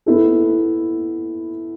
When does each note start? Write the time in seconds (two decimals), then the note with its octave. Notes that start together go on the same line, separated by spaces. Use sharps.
0.06 B3 E4 A4